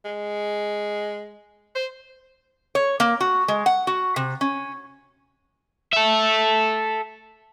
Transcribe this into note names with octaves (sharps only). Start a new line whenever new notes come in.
G#3
C5
C#5
A#3
F#4
G#3
F#5
F#4
C3
C#4
A4 E5